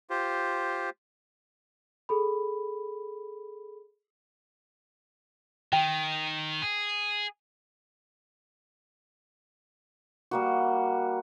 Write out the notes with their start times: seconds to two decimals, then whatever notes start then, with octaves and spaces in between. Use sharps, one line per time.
0.10 F4 G4 C5
2.09 G#4 A4 B5
5.73 D#3 G5
6.62 G#4
10.31 G3 A#3 F#4